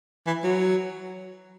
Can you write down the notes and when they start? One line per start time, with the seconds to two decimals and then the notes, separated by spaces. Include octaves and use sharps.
0.27 E3
0.44 F#3